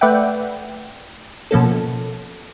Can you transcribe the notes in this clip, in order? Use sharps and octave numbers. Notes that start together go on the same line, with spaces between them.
A3 B4 D5 E5 F#5 G5
B2 F3 A#3 C#4 A4